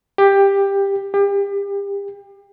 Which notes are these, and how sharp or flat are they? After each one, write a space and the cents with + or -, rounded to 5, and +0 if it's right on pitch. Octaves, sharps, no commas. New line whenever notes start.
G4 +15
G4 +35